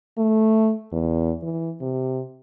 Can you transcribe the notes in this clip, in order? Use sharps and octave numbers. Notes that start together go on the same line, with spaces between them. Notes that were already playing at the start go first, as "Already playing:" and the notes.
A3
E2
E3
C3